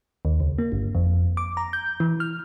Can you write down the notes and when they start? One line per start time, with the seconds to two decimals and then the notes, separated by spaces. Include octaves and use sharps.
0.25 D#2
0.40 C#2
0.58 A#3
0.72 G1
0.95 F2
1.37 D6
1.57 A#5
1.73 G6
2.00 E3
2.20 F6